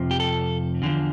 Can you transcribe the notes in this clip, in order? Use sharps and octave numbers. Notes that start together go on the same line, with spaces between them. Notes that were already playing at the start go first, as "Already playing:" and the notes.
Already playing: F2 C3 F3
G4
A4
E2 D3 F3